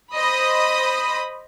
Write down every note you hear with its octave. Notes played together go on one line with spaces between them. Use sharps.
C5 D#5 B5 D#6